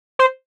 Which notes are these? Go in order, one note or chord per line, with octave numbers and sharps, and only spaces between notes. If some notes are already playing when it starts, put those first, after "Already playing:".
C5